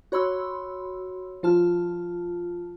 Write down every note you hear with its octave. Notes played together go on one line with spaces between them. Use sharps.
F#4 C#5 B5 C6 E6
F3 F4 A5 F6